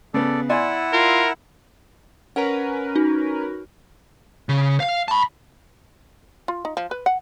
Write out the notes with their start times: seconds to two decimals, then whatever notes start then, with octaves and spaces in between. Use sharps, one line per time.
0.14 C#3 B3 A4 D5
0.49 E4 D5 F#5 G#5 C6 E6
0.93 F4 A#4
2.36 C#4 A#4 B4 F#5 A#5
2.96 D#4 F#4
4.49 C#3
4.80 F5
5.08 A5 B5
6.48 F4
6.65 D#4
6.77 F3
6.91 B4
7.06 F#5